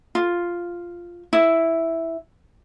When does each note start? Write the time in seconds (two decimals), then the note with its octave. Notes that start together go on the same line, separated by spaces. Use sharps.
0.15 F4
1.33 E4